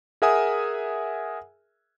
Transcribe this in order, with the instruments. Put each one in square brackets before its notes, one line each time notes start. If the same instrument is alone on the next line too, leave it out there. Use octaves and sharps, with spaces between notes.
[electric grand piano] G#4 A#4 E5 F#5 G#5 D#6